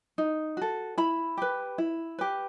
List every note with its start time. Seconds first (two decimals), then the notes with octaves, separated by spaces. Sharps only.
0.18 D#4
0.57 F#4 A4
0.98 E4 B5
1.37 G4 B4
1.78 E4
2.19 G4 B4